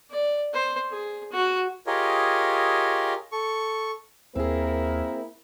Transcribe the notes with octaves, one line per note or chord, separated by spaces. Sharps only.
D5
C5
G#4
F#4
F4 G4 G#4 A#4 C#5 D#5
A4 C#6
D#2 A#3 C4 E4 G#4 A#4